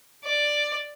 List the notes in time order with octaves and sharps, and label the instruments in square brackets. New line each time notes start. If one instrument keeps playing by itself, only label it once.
[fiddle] D5